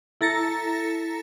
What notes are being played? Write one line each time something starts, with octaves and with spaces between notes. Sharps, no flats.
E4 A4 A#5 A6 A#6 C#7